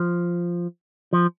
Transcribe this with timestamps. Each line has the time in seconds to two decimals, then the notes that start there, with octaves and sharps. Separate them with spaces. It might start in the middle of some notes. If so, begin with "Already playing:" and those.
Already playing: F3
1.13 F3